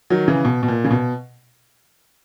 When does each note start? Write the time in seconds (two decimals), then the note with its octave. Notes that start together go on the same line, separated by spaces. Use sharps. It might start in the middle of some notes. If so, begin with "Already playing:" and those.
0.10 D#3 F#3
0.28 C#3 E3
0.45 B2
0.63 B2
0.68 A#2
0.84 C#3
0.91 B2